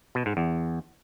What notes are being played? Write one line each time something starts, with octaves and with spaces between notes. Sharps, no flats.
B2
G#2
E2